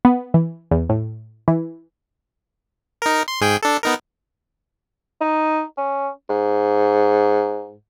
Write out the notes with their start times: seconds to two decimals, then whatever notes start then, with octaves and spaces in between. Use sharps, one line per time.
0.05 B3
0.34 E3
0.71 E2
0.89 A2
1.48 E3
3.02 D#4 A#4
3.28 C6
3.41 G#2 G#4 G5
3.62 D4 A4
3.83 B3 D#4 A#4
5.21 D#4
5.78 C#4
6.30 G#2